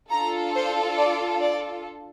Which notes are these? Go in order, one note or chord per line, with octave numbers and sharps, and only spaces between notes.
D4 F4 A4 A#5
C5
D5
D5